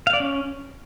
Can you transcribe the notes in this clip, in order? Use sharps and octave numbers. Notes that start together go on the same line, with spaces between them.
F5
D5
C#4